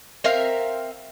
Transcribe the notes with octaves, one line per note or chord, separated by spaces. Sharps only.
C4 A#4 E5 F5